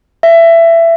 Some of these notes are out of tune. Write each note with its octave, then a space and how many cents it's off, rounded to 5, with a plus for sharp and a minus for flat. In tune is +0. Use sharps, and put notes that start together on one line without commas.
E5 +20